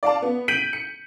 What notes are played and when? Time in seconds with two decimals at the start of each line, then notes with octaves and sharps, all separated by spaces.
0.03 D5 F5 A5
0.22 B3
0.48 G6 B6 D7 D#7 F#7
0.73 C#7